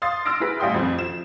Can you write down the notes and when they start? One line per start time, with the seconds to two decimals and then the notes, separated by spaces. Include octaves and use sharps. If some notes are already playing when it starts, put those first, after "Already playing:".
0.02 F5 C6 D#6 A6 C7
0.25 C6 E6 F6 A6 A#6 D7
0.40 E4 G#4 B4 B6
0.59 A1 G3 F5 G5 C6 D#6
0.74 F2 F3 C4
0.99 F3 E7